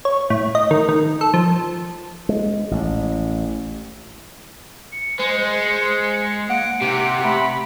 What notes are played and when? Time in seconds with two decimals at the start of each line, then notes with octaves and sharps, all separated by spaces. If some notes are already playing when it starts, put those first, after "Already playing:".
0.05 C#5
0.30 A2
0.55 D#5
0.71 D#3
0.89 D#3
1.21 A4
1.34 F3
2.29 G#3
2.71 A1
4.92 C#7
5.19 G#3 C5
6.50 A#3 F#5 D7
6.81 C3 G4 F#5
7.24 A3 B5